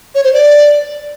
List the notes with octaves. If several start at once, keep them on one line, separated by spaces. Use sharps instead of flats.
C#5
C5
D5